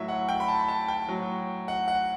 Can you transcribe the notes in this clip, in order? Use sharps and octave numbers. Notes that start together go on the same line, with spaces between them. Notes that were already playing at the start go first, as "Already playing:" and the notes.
Already playing: A2 F#3 E5
F#5
G5
B5
A5
B5
A5
G5
A2 F#3
F#5
F#5